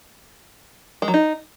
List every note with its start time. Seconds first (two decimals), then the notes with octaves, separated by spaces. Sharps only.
1.02 G#3
1.08 F#3
1.14 D#4